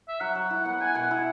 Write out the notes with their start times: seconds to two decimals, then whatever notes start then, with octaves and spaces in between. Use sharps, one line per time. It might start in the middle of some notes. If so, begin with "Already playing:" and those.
0.08 E5
0.20 F#3 F#5
0.35 F#3
0.50 E4
0.65 B3
0.80 G#4 G#5
0.95 B2 F#5
1.11 E4